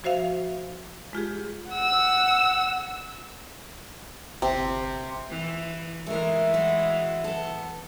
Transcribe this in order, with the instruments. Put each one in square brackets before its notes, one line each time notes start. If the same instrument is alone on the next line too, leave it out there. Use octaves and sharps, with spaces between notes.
[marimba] F3 F#4 C5 E5 F5
G#3 F4 G4 G#4
[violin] F#5 E6
[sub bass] G1 [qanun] C3
[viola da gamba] E3
[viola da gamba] E3 G#3 [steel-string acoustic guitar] A3 A#4
[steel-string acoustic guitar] E4 F#4
B3 A4